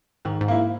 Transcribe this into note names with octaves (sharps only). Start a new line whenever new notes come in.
G#2 D#3
G#2
A#3 E4